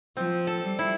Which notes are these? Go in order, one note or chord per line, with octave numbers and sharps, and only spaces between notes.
F3 C4
A4
G3
E4